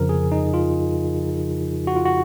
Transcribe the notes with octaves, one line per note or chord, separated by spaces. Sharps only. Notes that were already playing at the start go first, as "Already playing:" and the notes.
Already playing: F2 C#3 F3 A#4
G#4
D#4
F4
F#4
F4
F#4